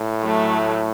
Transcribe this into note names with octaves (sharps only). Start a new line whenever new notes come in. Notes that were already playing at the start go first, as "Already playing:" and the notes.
Already playing: A2
F#3 A3